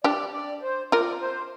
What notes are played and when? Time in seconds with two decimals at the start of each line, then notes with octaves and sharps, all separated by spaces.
0.04 D4 G4 D5
0.33 D5
0.62 C5
0.92 F4 A#4 D5
1.21 C5